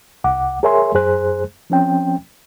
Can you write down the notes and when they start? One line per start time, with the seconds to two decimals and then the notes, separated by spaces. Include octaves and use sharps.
0.24 C2 F#5 D6
0.63 G#4 A#4 C#5 E5 G#5 C6
0.94 F#2 G#4 C5 F#6
1.70 F3 C4 C#4 G5